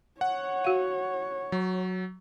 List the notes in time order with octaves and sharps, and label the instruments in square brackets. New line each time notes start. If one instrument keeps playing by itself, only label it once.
[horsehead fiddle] C#5 [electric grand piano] F#5
[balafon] F#4 F5
[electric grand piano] F#3